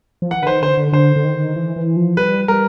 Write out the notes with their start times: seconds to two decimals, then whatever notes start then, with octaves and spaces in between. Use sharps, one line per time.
0.22 F3
0.31 E3 F#5
0.42 D3 B4
0.47 D#3 C5
0.62 D3 C5
0.77 D3
0.93 D3 C5
1.16 D3
1.25 D#3
1.56 E3
1.76 E3
1.96 F3
2.17 G3 B4
2.48 G3 A#4